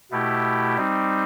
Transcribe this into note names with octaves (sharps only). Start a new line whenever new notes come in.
B2 A3 E4 G4
G3 C4 D#4